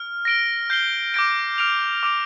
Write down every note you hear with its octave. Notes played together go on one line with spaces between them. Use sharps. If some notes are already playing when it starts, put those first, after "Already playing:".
Already playing: F6
A#6 D7 G7
G6 C7 G7
D6 G6 A#6 D7
F6 D7 F7
D6 F6 D7